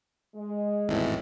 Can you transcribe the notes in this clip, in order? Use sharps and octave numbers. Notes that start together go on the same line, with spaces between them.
G#3
G#1 E2 A2